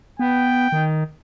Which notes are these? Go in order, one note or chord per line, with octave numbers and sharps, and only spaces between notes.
B3 G5
D#3